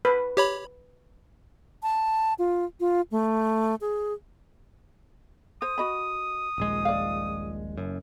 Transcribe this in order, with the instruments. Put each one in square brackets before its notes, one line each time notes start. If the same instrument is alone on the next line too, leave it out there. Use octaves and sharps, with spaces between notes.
[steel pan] B4
[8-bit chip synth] G4 C#5 B5
[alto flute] A5
F4
F4
A3
G#4
[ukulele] C5 [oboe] D#6
[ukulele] F#4 D#5 B5
[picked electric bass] D#1 A#1 G#3
[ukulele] D5 F5
[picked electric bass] F#1 F#2